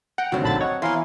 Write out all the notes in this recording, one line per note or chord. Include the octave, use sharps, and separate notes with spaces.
F#5 G5 A#5
D2 G2 D#3 F#3 C4
A#1 D3 A5 B5 A6
C#5 D#5 F#5
E3 B3 E4 F5 G#5 A#5 C6